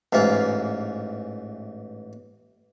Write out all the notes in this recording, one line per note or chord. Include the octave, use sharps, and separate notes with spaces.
A1 G#2 E3 F4